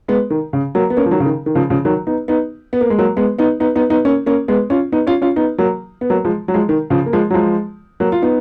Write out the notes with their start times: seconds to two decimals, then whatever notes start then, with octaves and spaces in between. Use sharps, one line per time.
0.08 G#3 B3
0.30 D#3
0.53 C#3
0.75 F#3 A#3
0.90 B3
0.97 A#3 C#4
1.06 F3
1.11 D#3 F#3
1.20 C#3
1.25 D#3
1.46 D#3
1.55 C#3 F3
1.70 C#3 F3
1.85 D#3 F#3
2.07 B3 D#4
2.28 B3 D#4
2.73 B3
2.81 A#3
2.90 G#3
2.99 F#3 A#3
3.17 G#3 B3
3.38 B3 D#4
3.60 B3 D#4
3.76 B3 D#4
3.90 B3 D#4
4.05 A#3 C#4
4.26 A#3 C#4
4.48 G#3 B3
4.70 C#4 F4
4.92 B3 D#4
5.07 C#4 F4
5.22 C#4 F4
5.36 B3 D#4
5.58 F#3 A#3
6.01 B3
6.10 F#3 A#3
6.25 F3 G#3
6.48 F#3
6.54 F3 G#3
6.69 D#3
6.90 C#3 F3
7.06 A#3
7.13 F3 G#3
7.31 F#3
7.34 F3 G#3
8.00 F#3 A#3
8.12 F4
8.22 B3 D#4